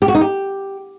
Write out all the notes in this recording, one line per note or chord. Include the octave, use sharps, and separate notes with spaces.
G4
F#4
D#4
G4